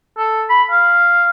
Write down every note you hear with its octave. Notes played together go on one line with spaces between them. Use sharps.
A4
B5
F5